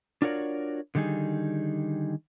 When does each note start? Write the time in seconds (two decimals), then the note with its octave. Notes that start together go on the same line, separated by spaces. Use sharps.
0.22 D4 F4 F#4 A#4 C#5 D5
0.95 D3 D#3 G3 D#4 G#4